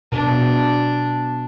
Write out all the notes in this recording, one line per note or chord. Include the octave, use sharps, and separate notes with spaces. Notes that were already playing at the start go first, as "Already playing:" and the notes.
B2 D4